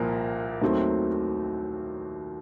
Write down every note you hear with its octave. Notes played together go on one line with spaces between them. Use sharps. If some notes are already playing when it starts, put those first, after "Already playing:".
Already playing: C2 A#2 F3 A#3
D#2 D#3 F#3 A3 C4